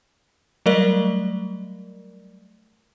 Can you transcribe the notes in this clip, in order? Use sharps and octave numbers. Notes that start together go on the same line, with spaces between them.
F#3 G3 A3 A#4 D5 D#5